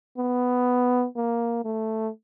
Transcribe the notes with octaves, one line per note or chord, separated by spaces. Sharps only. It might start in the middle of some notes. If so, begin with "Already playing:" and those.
B3
A#3
A3